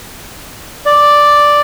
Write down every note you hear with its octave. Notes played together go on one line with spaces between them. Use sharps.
D5